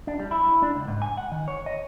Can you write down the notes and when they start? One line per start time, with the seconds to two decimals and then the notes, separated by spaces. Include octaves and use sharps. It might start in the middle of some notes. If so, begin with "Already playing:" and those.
0.07 D4
0.20 G3
0.31 E4
0.62 D4
0.75 C#2
0.87 G#2
1.02 G#5
1.17 F#5
1.32 D#3
1.48 C#5
1.66 D#5